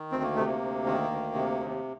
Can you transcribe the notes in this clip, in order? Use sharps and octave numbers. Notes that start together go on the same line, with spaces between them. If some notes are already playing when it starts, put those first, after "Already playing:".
Already playing: D#3
D2 C4
A#3
C3 A3
A#3
D2
D#3
D2
C3
D#2